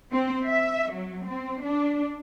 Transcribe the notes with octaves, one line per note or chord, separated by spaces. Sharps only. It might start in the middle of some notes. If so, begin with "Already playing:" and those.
C4
E5
F#3
C4
D4